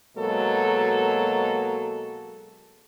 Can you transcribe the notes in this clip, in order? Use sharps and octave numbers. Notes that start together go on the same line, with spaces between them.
B2 F#3 G#3 A#3 A4